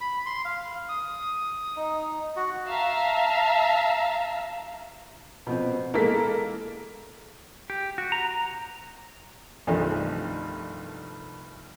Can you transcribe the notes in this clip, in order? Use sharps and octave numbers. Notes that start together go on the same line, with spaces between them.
B5
C6
F5
D#6
D#4
F#4
E5 F5 A5 A#5 E6
B2 F3 C4
E3 G#3 A#3 B3 A4 B6
G4
F#4
A#5
A#5
C2 G2 D#3 F3 A3